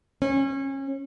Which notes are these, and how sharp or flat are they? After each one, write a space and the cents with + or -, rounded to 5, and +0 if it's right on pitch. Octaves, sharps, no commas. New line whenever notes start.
C#4 -25